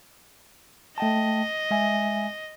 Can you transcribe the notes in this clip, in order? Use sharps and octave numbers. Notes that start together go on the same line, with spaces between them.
A3 D#5 G5 A5
G#3 E5 G#5